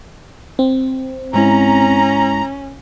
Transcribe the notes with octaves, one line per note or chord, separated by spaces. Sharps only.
C4
G#2 G#3 C#4 E4 A#5